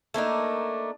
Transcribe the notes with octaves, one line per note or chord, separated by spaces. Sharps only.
A3 A#3 D4 D#4